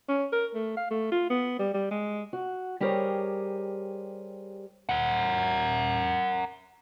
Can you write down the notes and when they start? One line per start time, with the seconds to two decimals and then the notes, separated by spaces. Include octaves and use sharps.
0.08 C#4
0.32 A#4
0.55 A3
0.77 F5
0.91 A3
1.12 F4
1.30 B3
1.59 G3
1.74 G3
1.91 G#3
2.33 F#4
2.80 G3 G4 G#4 A#4 C5 C#5
4.89 A#4 F#5